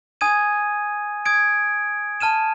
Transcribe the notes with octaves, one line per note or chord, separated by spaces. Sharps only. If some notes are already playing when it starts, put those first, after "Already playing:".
G#5 D#6 G#6 D#7
D#6 G#6 D7
A5 F6 D#7 E7